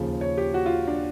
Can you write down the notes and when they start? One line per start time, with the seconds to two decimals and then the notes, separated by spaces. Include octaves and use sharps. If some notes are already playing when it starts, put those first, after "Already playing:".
Already playing: D#2 C#3 F3
0.21 C#5
0.38 G4
0.54 F#4
0.66 F4
0.87 D4